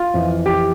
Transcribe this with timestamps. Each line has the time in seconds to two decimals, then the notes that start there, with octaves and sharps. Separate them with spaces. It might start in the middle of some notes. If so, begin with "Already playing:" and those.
Already playing: F4
0.14 F2 E3
0.46 G4